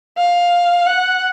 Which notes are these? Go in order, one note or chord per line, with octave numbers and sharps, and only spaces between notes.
F5
F#5